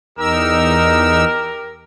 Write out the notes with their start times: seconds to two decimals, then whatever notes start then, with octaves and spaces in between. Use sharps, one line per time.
0.19 E2 D#4 G4 A#4 E6